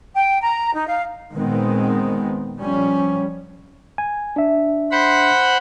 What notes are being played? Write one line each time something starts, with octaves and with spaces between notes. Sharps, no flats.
G5
A#5
D#4
F5
A#2 D#3 G#3 B3 C4
F3 G3 C#4
G#5
D4 E5
C5 F#5 B5